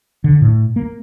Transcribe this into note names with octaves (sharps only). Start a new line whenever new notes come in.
D3
A2
A#3